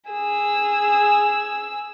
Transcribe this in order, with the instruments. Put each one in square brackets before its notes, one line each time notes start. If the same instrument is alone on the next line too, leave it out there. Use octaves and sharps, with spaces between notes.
[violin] G#4 E6